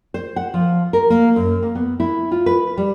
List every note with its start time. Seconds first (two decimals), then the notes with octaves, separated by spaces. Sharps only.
0.14 C5
0.36 F#5
0.54 F3
0.93 A#4
1.10 A#3
1.36 F#2
1.62 A#3
1.75 B3
2.00 E4
2.31 F4
2.46 B4
2.77 G3